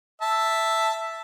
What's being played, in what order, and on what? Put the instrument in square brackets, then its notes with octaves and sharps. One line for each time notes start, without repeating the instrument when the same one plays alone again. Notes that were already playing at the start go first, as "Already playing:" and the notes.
[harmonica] E5 A5